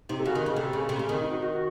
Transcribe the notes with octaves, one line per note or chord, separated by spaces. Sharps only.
C3 D#4
A4
C#3 F#4
D#3
C#3
C3 A4
C#3
C3
C#3
D#3
D#4
F#4
F#4
F#4